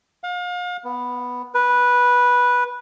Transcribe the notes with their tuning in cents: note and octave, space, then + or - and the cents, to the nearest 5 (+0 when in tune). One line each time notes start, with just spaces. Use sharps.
F5 +35
B3 +0
B4 -10